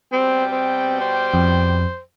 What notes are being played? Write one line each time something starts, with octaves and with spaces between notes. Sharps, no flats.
B2 G3 C4 G5
C4
C5
F2